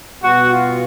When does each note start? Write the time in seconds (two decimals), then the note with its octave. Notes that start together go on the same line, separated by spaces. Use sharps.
0.21 B2 G3 B3 F#4
0.50 F4